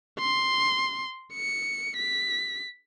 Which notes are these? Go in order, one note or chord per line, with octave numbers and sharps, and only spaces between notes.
C6
C#7
B6